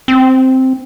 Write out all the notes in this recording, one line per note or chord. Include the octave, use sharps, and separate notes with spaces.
C4